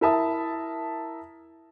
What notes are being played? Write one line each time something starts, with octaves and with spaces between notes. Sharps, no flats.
E4 A#4 E5 A5 D#6